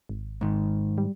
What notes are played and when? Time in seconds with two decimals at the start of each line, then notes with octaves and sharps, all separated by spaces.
0.09 G#1
0.41 G#2 D#3
0.98 G3